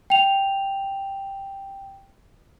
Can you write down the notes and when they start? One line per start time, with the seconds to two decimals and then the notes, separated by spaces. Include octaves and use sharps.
0.10 G5 F7